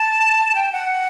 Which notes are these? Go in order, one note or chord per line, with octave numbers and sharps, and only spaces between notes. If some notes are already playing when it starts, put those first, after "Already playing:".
Already playing: A5
G5
F#5